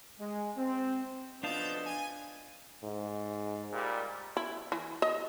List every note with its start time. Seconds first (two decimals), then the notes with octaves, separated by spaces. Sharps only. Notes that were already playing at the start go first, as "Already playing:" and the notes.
0.20 G#3
0.56 C4
1.43 F3 B3 D4 D#5 F5 A5 G6 A6
1.86 G#5 D#7
2.84 G#2
3.73 A#2 G3
4.37 E4
4.72 E3
5.02 D#5